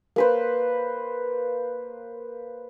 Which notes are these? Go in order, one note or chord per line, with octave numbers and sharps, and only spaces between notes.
A#3 B4 C5